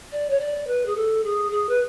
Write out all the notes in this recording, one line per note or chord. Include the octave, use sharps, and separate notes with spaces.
D5
C#5
D5
B4
G#4
A4
G#4
G#4
B4